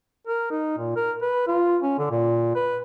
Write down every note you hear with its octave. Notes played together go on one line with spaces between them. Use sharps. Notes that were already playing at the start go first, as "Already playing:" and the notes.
A#4
D#4
A#2
A#4
B4
F4
C#4
D3
A#2
B4